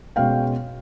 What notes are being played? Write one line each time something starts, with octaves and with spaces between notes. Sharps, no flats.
B2 G#3 C#4 F5 G5